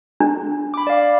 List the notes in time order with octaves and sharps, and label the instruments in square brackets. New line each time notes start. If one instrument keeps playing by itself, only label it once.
[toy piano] D4
[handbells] B5 D6
D5 F5